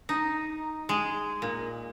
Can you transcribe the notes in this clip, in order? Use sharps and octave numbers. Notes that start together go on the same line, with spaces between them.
D#4
G#3
A#2